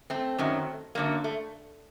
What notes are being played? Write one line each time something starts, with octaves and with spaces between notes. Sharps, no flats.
A3 C4
F#2 D#3 F#3
F#2 D3 F#3 A#3
A3